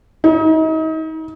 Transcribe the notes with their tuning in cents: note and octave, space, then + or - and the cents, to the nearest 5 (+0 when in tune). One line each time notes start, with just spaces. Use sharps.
D#4 +35